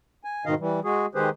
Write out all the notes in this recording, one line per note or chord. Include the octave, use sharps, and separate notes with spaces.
G#5
G#2 B2 D#3 D#5 F5
E3 G3
G#3 F#4 G#4
D#3 G#3 G4 G#4 B4 C5